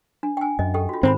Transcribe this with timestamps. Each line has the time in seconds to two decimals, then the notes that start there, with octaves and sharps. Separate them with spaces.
0.23 D4
0.37 G5 G#5
0.59 F#2 D#5
0.74 G4 A4 G5
0.89 F4 F#4
1.03 G#2 D#3 C4 C5 A#5 B5